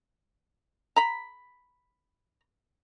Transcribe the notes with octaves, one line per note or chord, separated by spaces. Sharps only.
A#5 B5